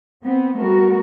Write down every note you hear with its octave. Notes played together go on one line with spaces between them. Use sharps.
B3 C4
G3 A3 B3 F#4 A#4